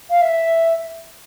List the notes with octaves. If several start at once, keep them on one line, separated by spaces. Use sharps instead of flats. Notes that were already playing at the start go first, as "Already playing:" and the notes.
F5
E5